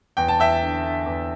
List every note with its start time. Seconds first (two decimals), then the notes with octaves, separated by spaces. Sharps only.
0.17 E2 G5
0.28 A5
0.39 E2 E5 G5
0.61 D3
0.84 D3
1.06 E2